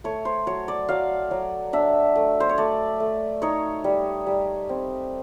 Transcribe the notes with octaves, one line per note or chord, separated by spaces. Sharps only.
A3 C#5
C5
F#3 C#5
D5
F#3 F5
F#3
D4 E5
A3
C5
C#5
A3 D5
A3
D#4 C#5
G3
G3
C4